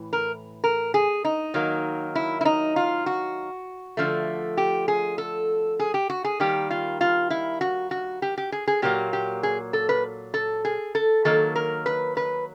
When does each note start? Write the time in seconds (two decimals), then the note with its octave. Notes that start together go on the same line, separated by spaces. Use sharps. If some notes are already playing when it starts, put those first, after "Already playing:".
Already playing: A2 E3
0.13 A#4
0.64 A#4
0.94 G#4
1.25 D#4
1.54 D#3 F#3 A#3
2.15 E4
2.41 E4
2.45 D#4
2.76 F4
3.06 F#4
3.97 D3 F3 A3
4.57 G4
4.88 G#4
5.18 A4
5.80 G#4
5.94 G4
6.10 F#4
6.24 G#4
6.40 D#3 G3 A#3 G4
6.70 F4
7.01 F4
7.30 E4
7.61 F#4
7.91 F#4
8.22 G4
8.38 G4
8.52 G#4
8.67 G#4
8.82 A#2 F#3 A#3 G4
9.13 G4
9.43 G#4
9.73 A4
9.89 B4
10.34 A4
10.65 G#4
10.95 A4
11.25 D#3 F#3 A#3 A4
11.55 A#4
11.86 B4
12.17 B4